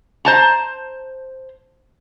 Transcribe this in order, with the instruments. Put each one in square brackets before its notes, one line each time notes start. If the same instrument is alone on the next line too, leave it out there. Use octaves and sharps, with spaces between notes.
[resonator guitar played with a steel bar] C5 A5 A#5